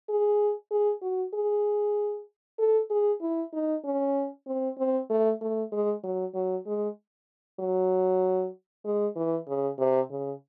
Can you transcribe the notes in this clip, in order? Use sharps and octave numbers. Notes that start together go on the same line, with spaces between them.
G#4
G#4
F#4
G#4
A4
G#4
E4
D#4
C#4
C4
C4
A3
A3
G#3
F#3
F#3
G#3
F#3
G#3
E3
C#3
C3
C#3